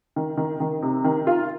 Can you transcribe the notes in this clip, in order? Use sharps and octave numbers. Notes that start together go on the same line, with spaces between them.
D#3
D#3
D#3
C3
D#3
F4